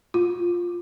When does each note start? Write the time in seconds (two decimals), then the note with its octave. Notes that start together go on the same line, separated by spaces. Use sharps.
0.14 F4